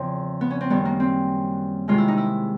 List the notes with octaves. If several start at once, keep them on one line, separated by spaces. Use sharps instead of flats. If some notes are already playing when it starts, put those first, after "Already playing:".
Already playing: E2 C#3 F3 C4 E4
B3
C#4
C4
F#2 D#3 G3 B3
A#3
C4
C3 D#3 G#3 F4
E4
D#4
E4